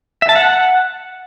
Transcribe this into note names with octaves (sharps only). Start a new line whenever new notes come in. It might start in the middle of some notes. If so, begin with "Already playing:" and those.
E5
A5
F#5